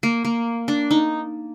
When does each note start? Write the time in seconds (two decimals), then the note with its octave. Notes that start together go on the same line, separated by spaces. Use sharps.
0.03 A#3
0.25 A#3
0.68 D4
0.91 D#4